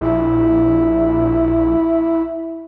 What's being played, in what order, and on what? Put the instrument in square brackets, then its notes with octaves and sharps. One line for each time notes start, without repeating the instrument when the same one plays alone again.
[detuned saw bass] A#1 [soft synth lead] E4